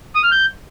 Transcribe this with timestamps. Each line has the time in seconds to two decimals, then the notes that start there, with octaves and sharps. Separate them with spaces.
0.15 D#6
0.23 F6
0.32 G6